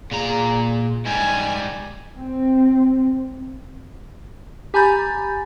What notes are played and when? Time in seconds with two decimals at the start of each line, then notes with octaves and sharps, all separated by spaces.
0.11 A#2 G#4 A#5
1.06 G#2 G3 G#5
2.18 C4
4.74 G4 G#5 A#5 B5 G6 A6